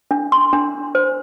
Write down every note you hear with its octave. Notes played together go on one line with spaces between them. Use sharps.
D4
C6
D4
C5